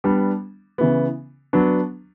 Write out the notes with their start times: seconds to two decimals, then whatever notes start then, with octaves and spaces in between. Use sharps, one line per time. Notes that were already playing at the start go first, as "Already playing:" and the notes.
0.04 G3 B3 D4
0.78 C#3 E3 B3
1.53 F#3 B3 D4